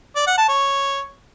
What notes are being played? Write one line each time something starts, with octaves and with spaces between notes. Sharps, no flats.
D5
F#5
A5
C#5